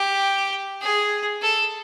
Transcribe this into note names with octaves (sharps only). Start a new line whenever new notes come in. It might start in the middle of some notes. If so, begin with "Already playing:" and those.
Already playing: G4
G#4
A4